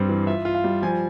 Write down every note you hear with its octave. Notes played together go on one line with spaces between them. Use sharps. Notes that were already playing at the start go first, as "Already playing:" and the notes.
Already playing: G2 G3 C4
E3
F4 E5
F4
F5
G3
F3 G#5